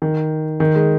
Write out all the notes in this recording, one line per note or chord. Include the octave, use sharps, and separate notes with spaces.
D#3
D#3
G#3